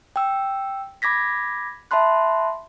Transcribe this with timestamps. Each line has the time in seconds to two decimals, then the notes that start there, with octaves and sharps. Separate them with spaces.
0.16 G5 E6
1.02 B5 D6 G#6 A#6 B6
1.91 E5 A5 B5 C6 F#6